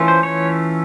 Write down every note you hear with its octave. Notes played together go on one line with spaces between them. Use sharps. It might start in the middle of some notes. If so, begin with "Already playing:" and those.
Already playing: E3 A3 C#4 F4
C5
C#5